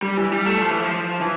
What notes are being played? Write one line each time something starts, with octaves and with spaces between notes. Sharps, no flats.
G3
E3
G3
A3
F3
E3
F3
E3